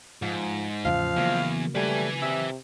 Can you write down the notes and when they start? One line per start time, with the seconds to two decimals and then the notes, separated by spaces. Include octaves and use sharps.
0.22 G#2 F3
0.85 E2 A2 C#3 F3 F5
1.17 E2 C#3 F#3 A#3
1.75 G3 A3 B4 G#5
2.22 C3 E5